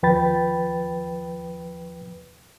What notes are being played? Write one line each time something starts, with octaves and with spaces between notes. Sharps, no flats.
D#2 F3 B4 G5 B5 A6